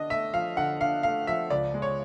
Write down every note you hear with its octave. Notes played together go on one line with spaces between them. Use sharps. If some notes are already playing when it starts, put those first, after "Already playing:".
Already playing: D3 D4 D#5
A3 E5
F3 F5
D3 F#5
D4 F5
A3 F5
F3 E5
C#2 D5
G#3
C#5